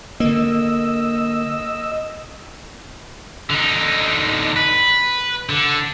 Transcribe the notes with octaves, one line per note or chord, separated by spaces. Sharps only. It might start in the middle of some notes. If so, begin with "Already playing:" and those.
D3 A#3 D#5 E6
D3 D#4
B4
D3